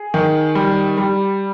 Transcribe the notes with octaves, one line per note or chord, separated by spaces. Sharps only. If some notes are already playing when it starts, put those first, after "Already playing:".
Already playing: G#4
D#3
G3
G3